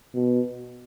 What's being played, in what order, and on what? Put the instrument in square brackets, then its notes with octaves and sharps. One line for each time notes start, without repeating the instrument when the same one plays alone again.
[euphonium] B2